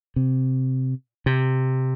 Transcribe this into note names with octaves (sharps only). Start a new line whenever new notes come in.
C3
C3